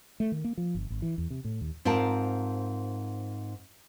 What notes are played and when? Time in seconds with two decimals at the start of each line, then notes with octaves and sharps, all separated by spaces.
0.20 A3
0.32 D#3
0.44 A#3
0.57 F3
0.75 G1
0.90 G#1
1.02 E3
1.18 E2
1.30 C3
1.45 A2
1.61 D#2
1.85 G#2 C4 F4 A#4 A5